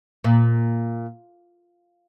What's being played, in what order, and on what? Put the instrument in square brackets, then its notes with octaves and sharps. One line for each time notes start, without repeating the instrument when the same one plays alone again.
[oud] A#2